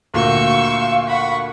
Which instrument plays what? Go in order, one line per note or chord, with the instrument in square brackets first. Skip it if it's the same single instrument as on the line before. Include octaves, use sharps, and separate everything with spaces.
[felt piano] D2 A#2 F#4 [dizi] F5 [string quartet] C#6 E6 G6
[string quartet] F#5 B5 C#6